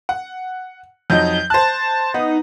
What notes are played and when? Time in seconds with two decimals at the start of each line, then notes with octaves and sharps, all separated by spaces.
0.09 F#5
1.10 F2 F#3 D#4 G6
1.50 C5 A5 F#6
2.14 B3 D#4